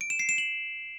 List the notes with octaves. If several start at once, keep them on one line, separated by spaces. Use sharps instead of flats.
D7
E7
C7
E7
F#7